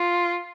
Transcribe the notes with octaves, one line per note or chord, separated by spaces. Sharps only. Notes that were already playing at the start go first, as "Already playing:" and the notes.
Already playing: F4